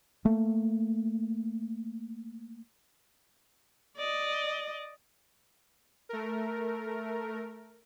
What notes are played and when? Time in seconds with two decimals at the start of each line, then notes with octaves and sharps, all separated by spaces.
0.25 A3 A#3
3.97 D5 D#5
6.09 A3 A#4